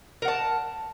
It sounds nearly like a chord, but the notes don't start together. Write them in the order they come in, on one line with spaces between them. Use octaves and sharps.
A#4 F#5 A5